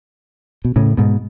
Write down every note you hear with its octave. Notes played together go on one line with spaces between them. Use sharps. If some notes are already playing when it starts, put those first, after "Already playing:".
B2
A2 C#3
G#2 B2